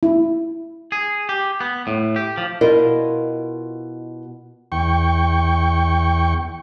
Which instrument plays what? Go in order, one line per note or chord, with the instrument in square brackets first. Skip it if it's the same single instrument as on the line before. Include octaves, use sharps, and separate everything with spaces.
[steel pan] E4
[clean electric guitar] G#4
G4
B3
A2
G4
F3
[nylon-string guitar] B2 E4 F4 A#4 D#5
[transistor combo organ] E2 G5 C#6